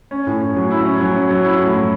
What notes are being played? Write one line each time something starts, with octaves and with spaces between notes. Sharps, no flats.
C#4
A2
C#4
F#3
E4
C#4
F#3
C#4
F#3
E4
A2
F#3